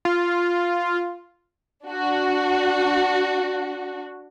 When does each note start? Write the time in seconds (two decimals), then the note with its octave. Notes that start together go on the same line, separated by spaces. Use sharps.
0.05 F4
1.85 D4 F#4